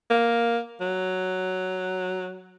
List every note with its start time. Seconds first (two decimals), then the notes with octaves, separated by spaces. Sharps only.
0.10 A#3
0.81 F#3